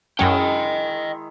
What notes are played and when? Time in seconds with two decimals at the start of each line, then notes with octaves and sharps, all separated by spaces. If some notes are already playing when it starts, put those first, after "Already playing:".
0.19 F#2 D#3 F#3 G#3 C#4 E4 D#5 G5